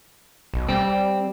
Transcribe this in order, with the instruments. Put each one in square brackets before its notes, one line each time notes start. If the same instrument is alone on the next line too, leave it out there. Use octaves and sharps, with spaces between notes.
[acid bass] B1
[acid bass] G3 [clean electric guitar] C4